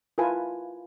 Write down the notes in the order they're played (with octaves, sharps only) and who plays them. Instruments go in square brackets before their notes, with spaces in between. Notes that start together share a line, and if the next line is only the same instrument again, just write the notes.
[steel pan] E4 F4 A#4 B4 G#5 A5